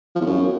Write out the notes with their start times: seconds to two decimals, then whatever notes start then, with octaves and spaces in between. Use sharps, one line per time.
0.15 F3
0.21 E2
0.26 F#2